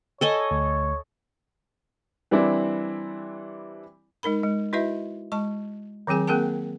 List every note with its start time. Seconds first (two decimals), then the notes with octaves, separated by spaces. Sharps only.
0.21 A4 C#5 D#5 G#5
0.51 D2
2.31 E3 G3 C4 D4 E4
4.23 G#3 D#4 A#4 B5
4.43 G#3
4.73 E4 F#4 B4 D#5 E5
5.32 G#3 A5 C#6
6.07 D#3 F#3 C4 G#4 G#5
6.28 A#3 C4 G#4 A#4 G5 A5